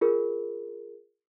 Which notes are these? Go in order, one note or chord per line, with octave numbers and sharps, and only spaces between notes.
F4 G#4 A#4